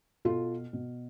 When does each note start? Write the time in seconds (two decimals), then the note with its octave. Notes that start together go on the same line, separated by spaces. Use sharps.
0.25 B2 F4 A4
0.73 B2